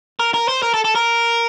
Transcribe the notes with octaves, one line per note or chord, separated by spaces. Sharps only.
A#4
A#4
C5
A#4
A4
A4
A#4